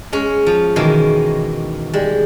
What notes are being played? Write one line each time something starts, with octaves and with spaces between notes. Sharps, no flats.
G#3 C#4
F3
B2 D#3 E3 G#3 A#3
G3 G#3